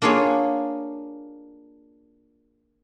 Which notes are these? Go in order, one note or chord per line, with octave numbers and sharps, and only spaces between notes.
A#3 D4 F4 G#4 C#5